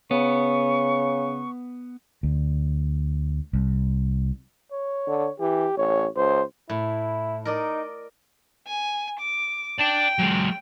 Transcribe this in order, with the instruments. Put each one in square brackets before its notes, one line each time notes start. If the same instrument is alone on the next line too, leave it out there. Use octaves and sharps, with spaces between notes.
[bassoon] C#3 [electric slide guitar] B3 [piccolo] C#6
[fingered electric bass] D2
C2
[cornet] C#5
[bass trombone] D3
[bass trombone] E3 [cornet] G4
[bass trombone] A1 [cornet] C#5
[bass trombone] C#2 [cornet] C5
[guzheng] A2 [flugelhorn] E4
[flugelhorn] D#4 [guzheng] A#4 D5 D#5
[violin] G#5
D6
[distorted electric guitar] D5 A5 [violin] G5
[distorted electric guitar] F#3 G#3